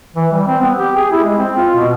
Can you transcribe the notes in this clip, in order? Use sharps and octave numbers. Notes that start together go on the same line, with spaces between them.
E3
G3
C4
B3
G4
G#4
E4
G#3
C4
F4
B2